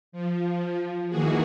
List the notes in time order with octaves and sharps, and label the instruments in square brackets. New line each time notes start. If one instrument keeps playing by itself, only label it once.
[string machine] F3
D#3 E3 A#3 F#4 G#4